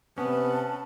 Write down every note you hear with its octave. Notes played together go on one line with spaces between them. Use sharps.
C3 B3 C#4 B4 A5